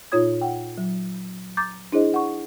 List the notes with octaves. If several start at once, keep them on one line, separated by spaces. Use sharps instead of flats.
A#2 D#4 F4 C#5 D#6 G#6
F#5 G5
F#3
A#5 D6 G6 A6
D4 E4 G#4 C5 D#5
F#5 C#6